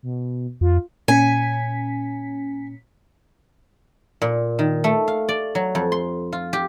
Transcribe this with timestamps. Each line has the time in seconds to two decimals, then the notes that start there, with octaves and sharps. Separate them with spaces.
0.03 B2
0.61 F2 F4
1.08 A#2 C#4 G#5 B6
4.22 A#2
4.59 D#3
4.84 A3
5.08 F5
5.29 D5
5.55 F#3
5.75 F2
5.92 C6
6.33 F4
6.53 G4